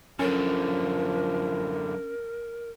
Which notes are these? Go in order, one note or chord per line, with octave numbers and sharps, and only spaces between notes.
F#2 D3 F3 C#4 A#4